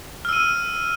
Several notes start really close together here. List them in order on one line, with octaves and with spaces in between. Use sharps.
F6 E6 D#7